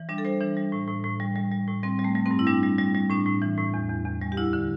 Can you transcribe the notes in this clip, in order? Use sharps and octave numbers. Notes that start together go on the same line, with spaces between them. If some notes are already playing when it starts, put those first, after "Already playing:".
Already playing: E3
G3 D4
A4
G3 C5
E3 D4
G3
A2
A2
A2
G3
G3
G3
A2
G3 C4
G3
A3
G3
C4
G2
E4
G3 D4
G3
G3
G3
A2 D4
A2
E3
A2
E2
E2
E2
G3
G4
D2 E4
D3